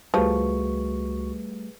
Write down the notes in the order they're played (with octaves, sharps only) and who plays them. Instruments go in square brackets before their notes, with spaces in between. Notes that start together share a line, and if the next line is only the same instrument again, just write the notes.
[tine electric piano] C#2 F#4 C#6 [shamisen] F3 [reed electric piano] G3 A3 [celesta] G#4 B4